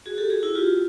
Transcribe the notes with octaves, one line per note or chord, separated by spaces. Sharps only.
F#4 G#4
G4 A4
F#4 G#4
E4 F#4
F4 G4